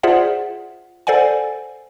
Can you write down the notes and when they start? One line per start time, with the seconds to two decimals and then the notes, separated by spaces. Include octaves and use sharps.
0.03 F4 G#4 C5 D5 E5 F#5
1.07 A4 C5 D5 F#5 G#5